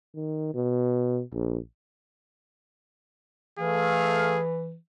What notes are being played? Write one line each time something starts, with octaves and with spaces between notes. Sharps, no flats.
D#3
B2
A#1
E3 A3 G#4 F5